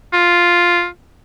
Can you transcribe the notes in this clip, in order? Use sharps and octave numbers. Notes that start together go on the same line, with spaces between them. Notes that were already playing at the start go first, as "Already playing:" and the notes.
F4